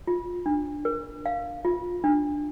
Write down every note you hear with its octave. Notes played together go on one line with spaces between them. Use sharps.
F4
D4
A#4
F5
F4
D4